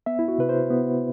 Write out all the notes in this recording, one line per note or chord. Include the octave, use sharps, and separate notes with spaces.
B3 E5
E4
F#4
C3 B4
C5
B3